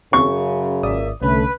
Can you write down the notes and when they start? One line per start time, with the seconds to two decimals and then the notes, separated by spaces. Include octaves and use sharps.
0.13 F#2 C#3 C#6
0.83 G#1 C#2 A#3 D5 E5 D#6
1.22 C2 D3 A3 C#4 B4